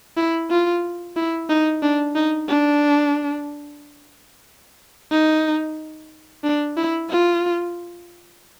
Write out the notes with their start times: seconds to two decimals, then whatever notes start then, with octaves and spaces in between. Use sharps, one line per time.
0.17 E4
0.50 F4
1.16 E4
1.49 D#4
1.83 D4
2.15 D#4
2.49 D4
5.11 D#4
6.44 D4
6.77 E4
7.10 F4